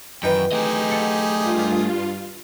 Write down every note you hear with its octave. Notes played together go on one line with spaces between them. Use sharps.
F#2 D#3 E3 B4 G5
A3 D#4 G4 G#4 D#5
A4 F#5
G2 F4